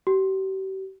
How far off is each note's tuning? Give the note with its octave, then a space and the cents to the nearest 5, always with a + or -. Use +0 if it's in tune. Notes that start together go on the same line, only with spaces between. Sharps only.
G4 -40